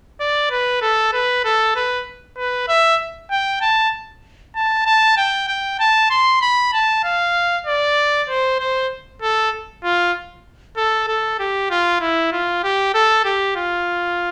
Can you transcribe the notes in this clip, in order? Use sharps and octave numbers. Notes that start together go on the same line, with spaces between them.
D5
B4
A4
B4
A4
B4
B4
E5
G5
A5
A5
A5
G5
G5
A5
C6
B5
A5
F5
D5
C5
C5
A4
F4
A4
A4
G4
F4
E4
F4
G4
A4
G4
F4